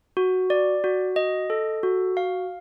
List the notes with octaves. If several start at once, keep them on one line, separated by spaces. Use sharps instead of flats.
F#4
D5
F#4
D#5
A4
F#4
F5